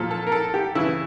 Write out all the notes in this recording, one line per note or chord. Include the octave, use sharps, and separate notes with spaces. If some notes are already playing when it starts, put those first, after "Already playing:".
Already playing: A#2 F3 A4
A4
A#4
A4
G4
C#3 E3 E4